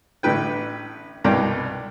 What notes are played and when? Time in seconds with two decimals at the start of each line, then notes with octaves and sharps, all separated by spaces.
0.23 A1 A2 D3 B4 G5
1.24 C2 G2 B2 D5 G5 D6